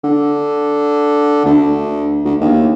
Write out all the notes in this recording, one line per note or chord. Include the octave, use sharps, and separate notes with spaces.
D3
D2
D2
D#2